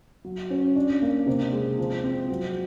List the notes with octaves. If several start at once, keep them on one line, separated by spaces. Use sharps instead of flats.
F#3
C#4
D4
A#3
C3
G#3
F3
C4
F#3